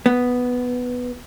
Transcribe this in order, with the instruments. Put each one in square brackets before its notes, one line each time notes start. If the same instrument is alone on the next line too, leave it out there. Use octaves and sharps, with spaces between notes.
[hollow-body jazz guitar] B3